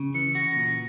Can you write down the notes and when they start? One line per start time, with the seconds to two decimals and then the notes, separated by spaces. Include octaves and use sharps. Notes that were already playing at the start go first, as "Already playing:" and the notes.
Already playing: C#3
0.14 E3 C#7
0.35 F#4 A#6
0.56 A#2